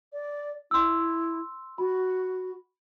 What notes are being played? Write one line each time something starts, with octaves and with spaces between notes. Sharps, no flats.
D5
E4 C6 E6
F#4 B5